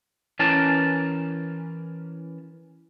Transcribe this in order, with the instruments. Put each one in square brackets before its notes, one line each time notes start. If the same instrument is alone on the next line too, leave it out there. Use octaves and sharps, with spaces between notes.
[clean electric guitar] E3 C#4 A#4 A5